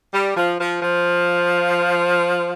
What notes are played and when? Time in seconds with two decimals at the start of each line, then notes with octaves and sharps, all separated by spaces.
0.13 G3
0.36 F3
0.59 F3
0.82 F3